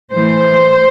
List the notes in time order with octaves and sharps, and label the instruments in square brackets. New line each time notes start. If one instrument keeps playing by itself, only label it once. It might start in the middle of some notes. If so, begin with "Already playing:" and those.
[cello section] A2 E3 A3 C5